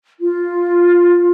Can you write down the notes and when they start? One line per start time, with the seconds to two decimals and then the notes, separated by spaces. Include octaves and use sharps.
0.20 F4